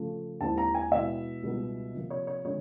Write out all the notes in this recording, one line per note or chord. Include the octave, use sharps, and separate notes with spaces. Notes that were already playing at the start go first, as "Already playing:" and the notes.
Already playing: C#3 F3 A3
D#2 D#3 G#3 C4 E4 A5
A#5
G#5
B2 G#3 B3 E4 E5
C#2 B2 G3 B3 D#4
C3 F3 A#3
C#5
C#5
D3 F3 G#3 C#4 C#5